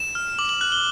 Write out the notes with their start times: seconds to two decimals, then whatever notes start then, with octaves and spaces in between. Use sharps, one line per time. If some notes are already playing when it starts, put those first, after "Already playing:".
Already playing: E7
0.15 F6
0.39 D6 F#7
0.49 F#7
0.61 F#6 F#7
0.72 G7